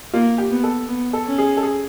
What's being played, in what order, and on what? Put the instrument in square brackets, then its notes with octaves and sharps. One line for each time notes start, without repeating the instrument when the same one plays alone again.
[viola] A#3 [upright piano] F4
[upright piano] G4
[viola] B3
[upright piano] A4
[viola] B3
[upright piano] A4
[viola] C#4
[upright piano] G#4
A4
G#4